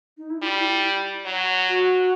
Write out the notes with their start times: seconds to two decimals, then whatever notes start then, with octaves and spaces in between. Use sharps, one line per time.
0.18 D#4
0.30 E4
0.42 G3 F4
0.57 E4
0.70 E4
1.25 F#3
1.68 F#4